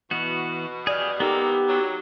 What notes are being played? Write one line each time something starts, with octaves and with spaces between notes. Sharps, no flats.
B2 E3 B3 F#4
G4 G#4 D5 F6
D#3 G#3 A#3 B3 D#4 G4 A4 E6
F#3